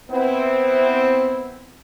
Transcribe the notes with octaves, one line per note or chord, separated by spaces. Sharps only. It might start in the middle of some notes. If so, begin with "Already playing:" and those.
B3 C4 E4